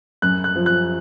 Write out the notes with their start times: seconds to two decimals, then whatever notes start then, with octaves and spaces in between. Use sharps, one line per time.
0.22 F#2 F#6
0.44 F#6
0.56 F3
0.66 F#6